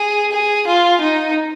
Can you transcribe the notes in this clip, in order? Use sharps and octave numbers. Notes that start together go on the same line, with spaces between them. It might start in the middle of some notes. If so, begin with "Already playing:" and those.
Already playing: G#4
G#4
F4
D#4